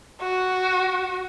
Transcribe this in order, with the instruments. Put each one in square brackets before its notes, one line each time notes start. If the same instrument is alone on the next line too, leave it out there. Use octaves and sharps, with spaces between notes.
[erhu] F#4